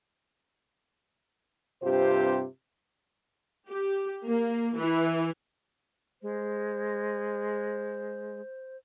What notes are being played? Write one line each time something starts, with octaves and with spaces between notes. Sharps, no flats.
G2 C3 C4 F4 G4 C5
G4
A#3
E3
G#3 C5